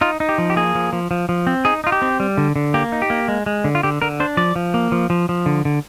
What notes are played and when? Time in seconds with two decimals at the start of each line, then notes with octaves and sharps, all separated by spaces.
0.01 D#4 F4
0.20 D#4
0.29 G4
0.38 F3
0.50 G4
0.56 A#3 G#4
0.75 F3
0.93 F3
1.11 F3
1.29 F3
1.47 C4
1.65 D#4 G#4
1.84 D#4 F4
1.92 G4
2.02 C4
2.20 G3
2.38 D3
2.56 D3
2.74 A#3 G4
2.92 D#4
3.02 G4
3.10 A#3
3.28 G#3
3.46 G#3
3.64 D3
3.75 F4
3.83 D3 G4
4.02 D3 A#4
4.20 D4 C5
4.37 F3 D5
4.56 F3
4.74 A#3
4.92 F3
5.10 F3
5.29 F3
5.46 D3
5.65 D3